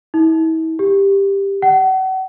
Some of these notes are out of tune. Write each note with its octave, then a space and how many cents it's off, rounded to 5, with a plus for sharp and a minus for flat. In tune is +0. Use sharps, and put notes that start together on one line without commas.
E4 -40
G4 +10
F#5 +35